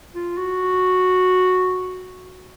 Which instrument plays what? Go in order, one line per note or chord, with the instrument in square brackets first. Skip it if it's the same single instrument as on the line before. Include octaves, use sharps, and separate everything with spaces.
[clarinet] F4
F#4